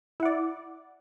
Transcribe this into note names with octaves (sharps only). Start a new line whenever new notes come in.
E4 D5 F#5